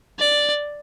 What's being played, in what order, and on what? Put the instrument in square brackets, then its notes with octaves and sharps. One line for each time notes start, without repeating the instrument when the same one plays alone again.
[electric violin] D5